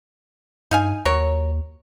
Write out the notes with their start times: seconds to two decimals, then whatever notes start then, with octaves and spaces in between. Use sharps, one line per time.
0.71 G2 D#4 F5 G#5
1.05 D#2 F#3 A#4 C#5